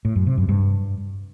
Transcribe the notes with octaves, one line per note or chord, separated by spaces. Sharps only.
A2
F#2
C3
F#2
G2